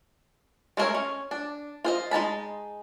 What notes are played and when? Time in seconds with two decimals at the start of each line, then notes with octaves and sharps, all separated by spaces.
0.77 G#3 A3 B3 A#4 C#5
0.95 C#4
1.31 D4
1.84 F4 C5 D#5
2.11 G#3 D#4 A5 B5